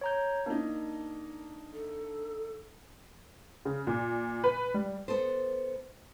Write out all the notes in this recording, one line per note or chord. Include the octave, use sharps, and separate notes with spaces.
C#5 A#5 G6
A#3 D4 D#4
A4
C#3
A#2
B4
G3
B3 A4 C5